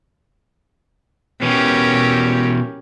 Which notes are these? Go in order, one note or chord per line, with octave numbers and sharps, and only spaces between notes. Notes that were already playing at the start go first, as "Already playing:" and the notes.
B2 E3 C#4 G4 A#4